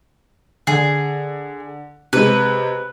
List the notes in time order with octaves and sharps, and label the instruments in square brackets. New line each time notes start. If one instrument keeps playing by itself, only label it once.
[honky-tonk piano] D3 [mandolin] G#4
[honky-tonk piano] C3 G#3 [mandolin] B4